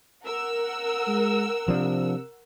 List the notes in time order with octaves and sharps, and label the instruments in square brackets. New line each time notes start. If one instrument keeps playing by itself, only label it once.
[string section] A#4 F#5 E6
[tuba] G#3
[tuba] C3 [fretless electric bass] F3 D4